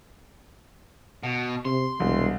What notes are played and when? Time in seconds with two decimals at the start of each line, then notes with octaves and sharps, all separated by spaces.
1.23 B2
1.65 C3 C6
2.00 E1 C2